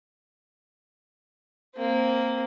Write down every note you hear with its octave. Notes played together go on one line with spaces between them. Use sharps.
A#3 C4